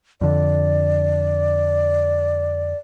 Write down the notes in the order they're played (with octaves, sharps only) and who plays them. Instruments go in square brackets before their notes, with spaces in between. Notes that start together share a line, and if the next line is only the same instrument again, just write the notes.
[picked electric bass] F2 D3 [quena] D5